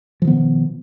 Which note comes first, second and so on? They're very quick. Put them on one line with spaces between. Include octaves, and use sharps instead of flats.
F3 D#3 B3 B2